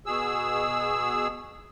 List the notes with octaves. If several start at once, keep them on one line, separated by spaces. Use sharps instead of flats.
B2 G#4 E6